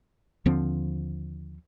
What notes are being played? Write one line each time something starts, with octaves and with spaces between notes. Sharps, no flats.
D#2 D3 F3 C4